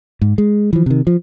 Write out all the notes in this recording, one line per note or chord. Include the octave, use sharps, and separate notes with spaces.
G#2
G#3
E3 F3
C3 D#3
F3